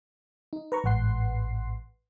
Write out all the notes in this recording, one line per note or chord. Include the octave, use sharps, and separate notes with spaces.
D#4
B4 A#5 C#6
A1 G#2 B4 F#5 C6 C7